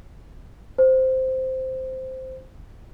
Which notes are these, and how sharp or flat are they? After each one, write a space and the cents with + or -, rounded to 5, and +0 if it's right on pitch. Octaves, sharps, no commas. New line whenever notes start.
C5 -5